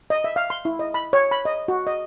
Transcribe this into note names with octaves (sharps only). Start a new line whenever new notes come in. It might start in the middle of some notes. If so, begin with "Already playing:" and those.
D#5
E5
F5
C6
E4
D#5
B5
C#5
B5
D#5
F#4
D#5